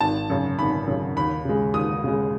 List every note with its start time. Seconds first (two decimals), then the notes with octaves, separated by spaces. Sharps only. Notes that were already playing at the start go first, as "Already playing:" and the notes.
0.01 G#1 A5
0.30 F#2 C#3
0.58 G#1 B5
0.87 F#2 C#3
1.16 D#2 B5
1.45 C#3 G#3
1.74 D#2 D#6
2.04 C#3 G#3